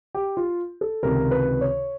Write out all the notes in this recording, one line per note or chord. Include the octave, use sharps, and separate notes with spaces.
G4
F4
A4
C#2 C3 D#3 A#4
B4
C#5